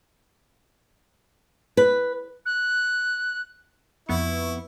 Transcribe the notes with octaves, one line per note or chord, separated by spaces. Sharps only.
B4
F#6
F2 B3 E4 C#6